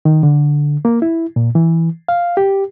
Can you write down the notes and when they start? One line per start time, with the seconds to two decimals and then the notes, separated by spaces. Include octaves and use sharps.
0.05 D#3
0.23 D3
0.85 A#3
1.02 E4
1.36 A#2
1.55 E3
2.08 F5
2.37 G4